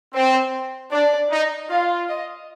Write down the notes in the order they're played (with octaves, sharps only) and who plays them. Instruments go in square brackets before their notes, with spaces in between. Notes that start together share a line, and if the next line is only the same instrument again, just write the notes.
[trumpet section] C4 [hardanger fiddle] C5
[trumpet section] D4 [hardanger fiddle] D5
[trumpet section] D#4
[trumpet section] F4 [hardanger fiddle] F5
[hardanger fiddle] D#5